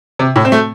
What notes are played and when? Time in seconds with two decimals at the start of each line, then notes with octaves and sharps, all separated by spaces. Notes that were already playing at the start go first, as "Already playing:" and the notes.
0.19 C3
0.36 A2
0.45 C4
0.52 A3